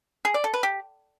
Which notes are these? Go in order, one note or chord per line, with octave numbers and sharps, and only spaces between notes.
G#4
D5
A4
B4
G4